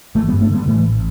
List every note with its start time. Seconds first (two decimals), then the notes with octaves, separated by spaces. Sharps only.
0.14 G1 E3 A3
0.28 G3 B3
0.33 G2
0.41 A3 D4
0.50 D3 G3 B3
0.67 A2 E3 A3
0.85 A1